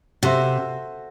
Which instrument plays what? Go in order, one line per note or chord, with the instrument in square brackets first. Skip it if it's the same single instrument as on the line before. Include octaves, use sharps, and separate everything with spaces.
[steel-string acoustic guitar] C3 [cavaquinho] F#4 A4 C5 E5